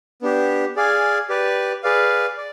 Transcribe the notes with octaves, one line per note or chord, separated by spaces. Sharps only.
B3 D4 G4
G#4 D5 F5 G#5
G4 B4 D5
G#4 B4 D5 F5
D5